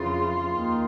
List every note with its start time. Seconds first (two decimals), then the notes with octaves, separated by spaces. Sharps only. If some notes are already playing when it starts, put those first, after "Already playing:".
Already playing: F2 C#3 E3 F4
0.52 D#2 D#3